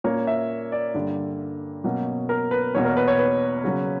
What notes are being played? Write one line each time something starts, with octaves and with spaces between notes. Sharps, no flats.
A#2 A#3 C#4 C#5
E5
D5
G2 D3 A#3
B2 F#3 A#3 C#4
A#4
B4
E2 B2 A#3 C#5
A#4
B4
C#5
B4
C#3 F#3 A#3 C#4